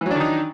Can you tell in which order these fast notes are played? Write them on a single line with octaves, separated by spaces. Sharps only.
E3 F#3 D4 D#3 D#4